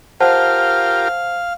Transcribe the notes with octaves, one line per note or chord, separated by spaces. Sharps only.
F4 G4 A#4 C5 F5 F#5 A5